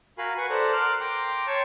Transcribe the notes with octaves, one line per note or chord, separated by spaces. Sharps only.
F#4 A#4 F5 G#5 B5
B4 F#5 C#6
A4 C5 D5 F#5 A#5
A#4 C6 D6 F6 F#6
G5 A#5 C6 D6
C#5 G5 A5 C6 C#6